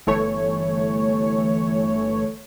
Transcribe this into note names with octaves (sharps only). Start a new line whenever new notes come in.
G1 E3 A3 C#5